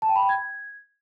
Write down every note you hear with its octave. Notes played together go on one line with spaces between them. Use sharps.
A5
G5
B5
G5
G#6